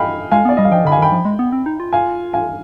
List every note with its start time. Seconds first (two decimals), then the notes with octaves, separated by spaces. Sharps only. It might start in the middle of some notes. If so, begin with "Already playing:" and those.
Already playing: D#5 F5 G5 G#5 B5
0.31 G#3 F5 G#5
0.45 B3 D5
0.57 G3 D#5
0.65 F5
0.72 F3 D#5 G5
0.85 D3 B5
0.92 F5 G#5
0.98 D#3 G5 B5
1.12 F3
1.25 G#3
1.39 B3
1.52 C4
1.66 D#4
1.80 F4
1.93 F5 G#5
2.34 F5 G#5